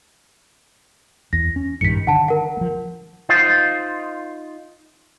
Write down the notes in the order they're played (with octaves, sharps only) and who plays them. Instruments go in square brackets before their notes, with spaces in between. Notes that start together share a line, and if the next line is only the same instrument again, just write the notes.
[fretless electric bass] E2 [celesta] A#6
[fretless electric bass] C#4
[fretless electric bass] A#1 G2 D#3 [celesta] B6 C#7
[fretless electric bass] D3 D#3 [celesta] F#5 A5
[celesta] A#4 F#5
[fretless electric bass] F3 A3
[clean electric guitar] D#4 F4 C5